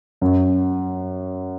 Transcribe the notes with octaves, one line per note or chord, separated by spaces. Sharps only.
F#2